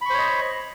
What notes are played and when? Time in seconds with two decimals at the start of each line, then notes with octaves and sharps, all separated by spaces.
0.01 B5
0.06 C#6
0.10 C5
0.14 C#5
0.18 D#5